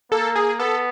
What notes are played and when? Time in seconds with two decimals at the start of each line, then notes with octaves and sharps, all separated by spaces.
0.12 A#3 A4
0.36 G#4
0.59 B3 A4